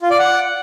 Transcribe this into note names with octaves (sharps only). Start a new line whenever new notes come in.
F4
D5
F#5